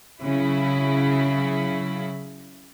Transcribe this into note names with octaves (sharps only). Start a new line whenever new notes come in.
C#3 F#3 E4